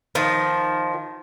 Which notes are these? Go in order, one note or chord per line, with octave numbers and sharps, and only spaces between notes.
D#3 F3